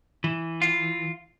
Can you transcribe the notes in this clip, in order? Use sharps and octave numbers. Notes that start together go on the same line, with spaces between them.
E3
F4